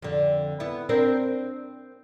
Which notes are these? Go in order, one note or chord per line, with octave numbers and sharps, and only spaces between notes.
F2 D3
B3 E4
C4 D4 A#4